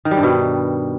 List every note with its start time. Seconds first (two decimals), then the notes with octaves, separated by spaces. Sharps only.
0.05 D#3
0.11 G3
0.17 G2
0.23 B2